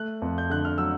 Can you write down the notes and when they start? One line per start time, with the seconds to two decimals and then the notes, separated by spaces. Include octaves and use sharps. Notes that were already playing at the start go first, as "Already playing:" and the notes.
Already playing: A3 F#6
0.22 F2
0.38 G6
0.50 D3 F#6
0.65 F6
0.78 F#3 E6